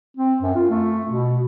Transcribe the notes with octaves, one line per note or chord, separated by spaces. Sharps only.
C4
F#2
F4
A3
B2